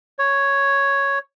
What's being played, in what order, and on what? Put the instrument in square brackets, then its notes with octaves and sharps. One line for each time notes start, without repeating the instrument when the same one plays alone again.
[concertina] C#5